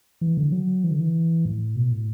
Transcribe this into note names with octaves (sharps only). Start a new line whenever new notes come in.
E3
D3
F#3
E3
D3
E3
A2
B2
A2